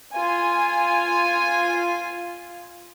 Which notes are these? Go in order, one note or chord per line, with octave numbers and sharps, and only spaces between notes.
F4 G#5